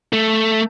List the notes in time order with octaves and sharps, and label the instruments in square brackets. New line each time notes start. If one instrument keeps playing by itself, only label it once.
[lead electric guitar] A3